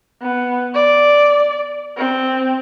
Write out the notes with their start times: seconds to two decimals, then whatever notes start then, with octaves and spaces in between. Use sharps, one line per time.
0.22 B3
0.75 D5
1.97 C4